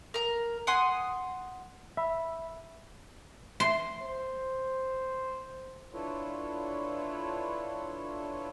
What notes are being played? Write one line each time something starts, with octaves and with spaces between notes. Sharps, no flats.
A#4 A#5
F#5 G#5 C6 D#6
E5 B5 E6
C6
C5
D4 E4 F4 A4 B4 C#5